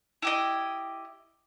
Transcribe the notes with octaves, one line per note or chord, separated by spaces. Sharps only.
E4 G4 D#5